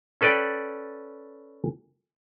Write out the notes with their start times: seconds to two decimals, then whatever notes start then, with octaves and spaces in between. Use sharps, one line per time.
0.21 C#4 A4 B4 D5 G5